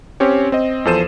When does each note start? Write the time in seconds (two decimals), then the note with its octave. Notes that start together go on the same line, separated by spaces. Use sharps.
0.20 C4 C#4 G4 C#5
0.52 C4 D#5
0.85 E2 F3 A4 C5 D#7 E7